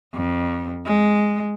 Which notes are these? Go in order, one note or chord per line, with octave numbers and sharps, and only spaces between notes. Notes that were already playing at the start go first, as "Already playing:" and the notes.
F2
G#3